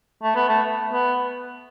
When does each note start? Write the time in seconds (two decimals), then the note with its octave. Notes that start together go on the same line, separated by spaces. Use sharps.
0.23 A3
0.36 B3
0.48 A3
0.93 B3